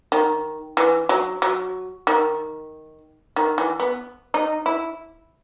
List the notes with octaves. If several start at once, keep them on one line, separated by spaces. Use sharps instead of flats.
D#3
E3
F#3
F#3
D#3
D#3
E3
B3
D#4
E4